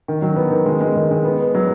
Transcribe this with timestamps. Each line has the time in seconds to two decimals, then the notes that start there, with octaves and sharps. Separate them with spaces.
0.08 D#3
0.22 F#3
0.36 B3
0.51 D#3
0.66 G#3
0.81 G#3
0.96 D#3
1.11 G#3
1.25 B3
1.40 B3
1.55 F#3